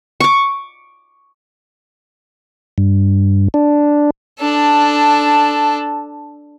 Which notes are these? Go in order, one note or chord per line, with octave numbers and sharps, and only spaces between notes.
C#6 D6
G2
D4
D4 A4